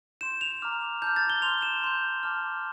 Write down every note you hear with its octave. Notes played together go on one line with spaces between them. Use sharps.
C6 G6 E7
F7
A#5 D6 F6
A5 D6 F6 G6
A6
G7
C6 F6 F7
E7
C6 G6
A5 D6 F6